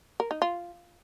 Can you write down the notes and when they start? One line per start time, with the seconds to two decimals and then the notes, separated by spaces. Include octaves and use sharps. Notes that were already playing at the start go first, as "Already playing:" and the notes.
0.20 A#4
0.31 D#4
0.42 F4